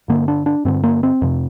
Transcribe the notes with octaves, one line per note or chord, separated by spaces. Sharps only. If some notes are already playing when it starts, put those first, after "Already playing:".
G2 D3 A#3
D4
D4
G2 D3 C4
A#3
C4
F2 C3